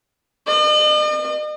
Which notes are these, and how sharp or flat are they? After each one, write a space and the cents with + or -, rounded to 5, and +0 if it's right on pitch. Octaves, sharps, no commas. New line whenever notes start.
D#5 -45